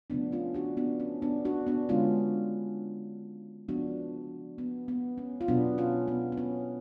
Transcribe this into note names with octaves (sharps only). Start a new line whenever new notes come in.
C#3 F3 A3 B3 D4
C#4 F4
D4 F#4
B3 D4
C#4
B3 D4
D4 F#4
B3 D4
D3 G#3 B3 C#4 F4
C#3 F3 B3 D4 F#4
B3
B3
C#4
F4
B2 F#3 B3 D4
C#4 F4
B3
B3
C#4